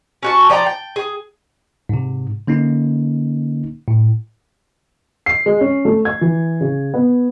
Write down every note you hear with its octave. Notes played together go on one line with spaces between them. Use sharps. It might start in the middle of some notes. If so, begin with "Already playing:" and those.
C#4 F#4 A5
F3 D5 G5 A#5
G5
G#4
G#2 C3
D3 A#3 C#4 D#4
A2
C7
G#3
C#4
A3
G#6
E3
C#3
B3